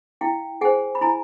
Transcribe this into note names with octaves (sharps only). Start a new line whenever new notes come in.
E4 F5 G5
G#4 C5 F#5 G#5
B5
E4 G#5 A#5